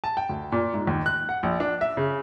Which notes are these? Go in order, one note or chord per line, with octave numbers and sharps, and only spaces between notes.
A5
G5
D2
A#2
G#2
D#2
F#6
F#5
A#1
D4
E5
C#3